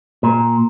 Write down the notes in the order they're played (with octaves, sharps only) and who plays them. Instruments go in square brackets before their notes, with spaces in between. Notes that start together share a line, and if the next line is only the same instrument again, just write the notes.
[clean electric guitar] A#2